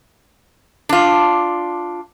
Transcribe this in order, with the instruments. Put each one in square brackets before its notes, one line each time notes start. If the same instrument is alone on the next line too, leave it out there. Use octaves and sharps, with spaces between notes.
[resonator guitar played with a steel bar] D4 F4